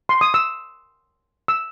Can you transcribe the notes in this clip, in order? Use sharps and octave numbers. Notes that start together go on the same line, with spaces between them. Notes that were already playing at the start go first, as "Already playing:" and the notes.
C6
D#6
E6
E6